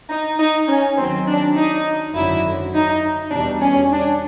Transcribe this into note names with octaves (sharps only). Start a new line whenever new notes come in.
D#4
D#4
C#4
D#2 D#3 F#3 C4
D4
D#4
G#1 F#2 D3 F#3 E4
D#4
E2 B2 G3 D4
C#4
D4